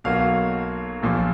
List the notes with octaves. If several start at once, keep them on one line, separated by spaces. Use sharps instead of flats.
B1 B2 F#3 A#3 F5
A#1 A#2 F3